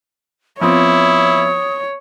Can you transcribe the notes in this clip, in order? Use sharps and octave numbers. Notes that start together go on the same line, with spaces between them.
F3 B3 C4 E4 C#5 D#6